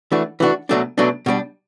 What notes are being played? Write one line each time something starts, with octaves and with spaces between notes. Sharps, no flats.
E3 A3 D4 F#4
E3 A3 D4 F#4
B2 F#3 A3 D4
B2 F#3 A3 D4
B2 G3 D4